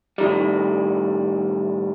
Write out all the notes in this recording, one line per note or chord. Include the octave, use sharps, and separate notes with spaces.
A2 D#3 G3